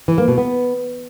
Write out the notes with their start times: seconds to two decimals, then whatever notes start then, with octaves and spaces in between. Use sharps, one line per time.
0.08 E3
0.18 A#3
0.28 B2
0.38 B3